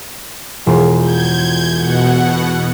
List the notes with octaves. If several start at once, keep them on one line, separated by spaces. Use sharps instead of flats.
E1 F4
G6 G#6
B2 F#5